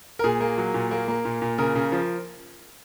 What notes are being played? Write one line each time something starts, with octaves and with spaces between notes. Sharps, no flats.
A#4
A#2 G#4
A#3
F#3
A#2
A#3
A#3
A#2
A#2
C#3 A#4
C#3
F3